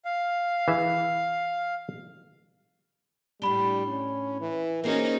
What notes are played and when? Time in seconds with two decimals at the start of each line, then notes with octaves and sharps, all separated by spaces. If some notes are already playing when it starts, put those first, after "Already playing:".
0.05 F5
0.68 E3 G#4 E5
3.42 A2 G3 D4 B5 G7
3.88 C#4
4.40 E3
4.84 A#3 C4 C#4 D#4 F#4 G#4 A#4